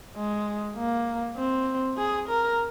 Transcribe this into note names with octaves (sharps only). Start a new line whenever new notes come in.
G#3
A#3
C4
G#4
A#4